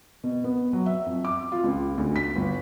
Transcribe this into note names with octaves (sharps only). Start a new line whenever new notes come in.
B2
B3
F#3
E5
F2
D6
F4
C#2
D2
B6
G1